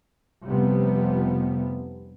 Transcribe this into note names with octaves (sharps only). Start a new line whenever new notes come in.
F1 C3 F3 G3 B3